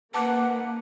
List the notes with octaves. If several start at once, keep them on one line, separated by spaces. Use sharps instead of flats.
G#2 C#3 A#3 B4 F#5 A5 D6 F#6